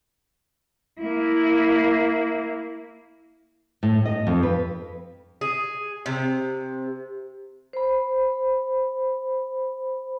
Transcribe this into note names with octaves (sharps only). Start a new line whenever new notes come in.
A#3 E4
A2
D#5
F2
B4
G#4
C3
C5 B5